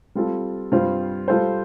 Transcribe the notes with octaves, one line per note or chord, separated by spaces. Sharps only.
G3 C4 F4 A4
G2 G3 C4 F4 C5
G3 F4 A4 C5